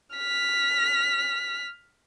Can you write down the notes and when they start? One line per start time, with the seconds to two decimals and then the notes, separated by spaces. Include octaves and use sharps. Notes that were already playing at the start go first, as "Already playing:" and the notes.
0.16 F6 B6